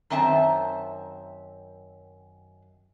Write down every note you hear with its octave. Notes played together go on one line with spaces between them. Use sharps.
F#2 D#3 C4 E5 G#5 A5